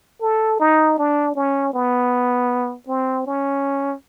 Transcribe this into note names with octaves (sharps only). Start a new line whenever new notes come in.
A4
D#4
D4
C#4
B3
C4
C#4